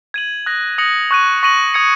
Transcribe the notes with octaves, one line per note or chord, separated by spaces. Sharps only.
G#6 D#7 F#7
D#6 F#6 A#6 F#7
D#6 A#6 C#7 F#7
C#6 F#6 D#7
C#6 A#6 D#7 F#7
D#6 G#6 C#7